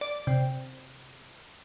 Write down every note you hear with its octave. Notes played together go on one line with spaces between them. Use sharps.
D5
C3